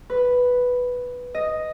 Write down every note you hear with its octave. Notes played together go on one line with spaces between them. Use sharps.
B4
D#5